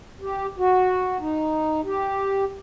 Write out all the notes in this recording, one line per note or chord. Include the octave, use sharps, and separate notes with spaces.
G4
F#4
D#4
G4